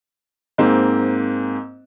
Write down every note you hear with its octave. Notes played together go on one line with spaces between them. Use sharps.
G#2 A#3 C4